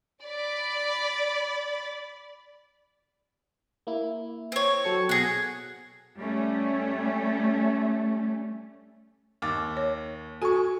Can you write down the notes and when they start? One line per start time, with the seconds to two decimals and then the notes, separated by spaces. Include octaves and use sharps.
0.24 D5 B5
3.87 A#3 E4
4.52 C4 C#5
4.84 F#3 A4 C#7
5.09 B2 G#4 F#5 A#6
6.18 G3 A3 C#4
9.42 D#2 D6 A6
9.77 C#5
10.42 F#4 A4 G#5 C#6